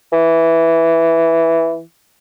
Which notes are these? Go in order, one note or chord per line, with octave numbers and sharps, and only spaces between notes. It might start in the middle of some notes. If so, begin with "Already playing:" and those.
E3